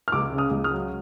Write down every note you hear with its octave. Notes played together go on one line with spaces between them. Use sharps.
F6
C#2 D6 E6
C#3
D#6 F6
C#2
D#6 F6
F#3